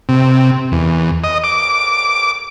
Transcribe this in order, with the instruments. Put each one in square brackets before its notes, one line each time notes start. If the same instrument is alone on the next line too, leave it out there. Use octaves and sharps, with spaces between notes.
[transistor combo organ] C3
E2
D#5
D6